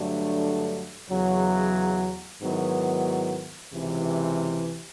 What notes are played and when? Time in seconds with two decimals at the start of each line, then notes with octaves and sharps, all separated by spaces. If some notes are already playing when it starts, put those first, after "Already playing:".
Already playing: G2 D3 F#3 A3 D4
1.09 E2 C#3 F#3
2.40 G#2 D#3 F#3 B3 E4
3.72 C#2 C3 E3